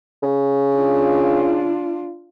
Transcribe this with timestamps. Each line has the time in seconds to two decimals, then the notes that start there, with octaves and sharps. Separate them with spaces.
0.23 C#3
0.76 D4 F4